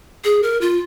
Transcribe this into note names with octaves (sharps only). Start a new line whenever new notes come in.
G#4
A#4
F4